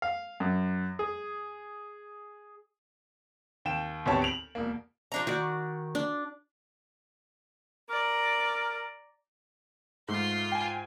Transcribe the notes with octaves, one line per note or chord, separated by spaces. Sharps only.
F5
F#2
G#4
D#2 G5 E7
G#1 D2 B3 G4 C#5 A5
D7 F7 F#7
E1 A#3
F3 D4 A#5
D#3 F#4 D5
D4
A#4 D5 A#5
G#2 A3 F4 C6
G5 G#5